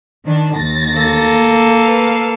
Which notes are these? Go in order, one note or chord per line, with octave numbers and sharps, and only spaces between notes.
D#3 D4
D#2 A6 A#6
A#3 A4
B4 F5